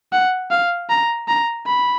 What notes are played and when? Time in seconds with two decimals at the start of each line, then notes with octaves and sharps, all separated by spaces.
0.12 F#5
0.51 F5
0.90 A#5
1.28 A#5
1.66 B5